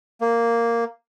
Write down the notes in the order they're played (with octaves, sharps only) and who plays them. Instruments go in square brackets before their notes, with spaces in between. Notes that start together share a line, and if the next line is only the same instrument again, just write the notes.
[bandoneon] A#3